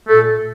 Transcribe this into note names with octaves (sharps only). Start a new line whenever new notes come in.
A#2 A3 A4